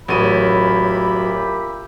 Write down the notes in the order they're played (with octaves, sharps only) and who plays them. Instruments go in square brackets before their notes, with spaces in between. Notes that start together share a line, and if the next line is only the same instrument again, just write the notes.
[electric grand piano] A1 C#5 D#7 [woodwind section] A#2 E5 B5 [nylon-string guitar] F#3 [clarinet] G4